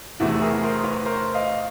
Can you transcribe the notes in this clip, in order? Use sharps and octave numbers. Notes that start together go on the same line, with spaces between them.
E2 C3 E3 A3 E4 F#4
G#4 A#4
A#4 C5
B4 C#5
A#4 C5
D#5 F5